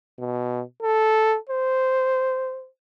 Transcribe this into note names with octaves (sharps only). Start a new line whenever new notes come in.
B2
A4
C5